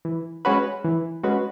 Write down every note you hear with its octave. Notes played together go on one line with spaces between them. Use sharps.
E3
G#3 C#4 F#4 B4
E3
G#3 C#4 F#4 B4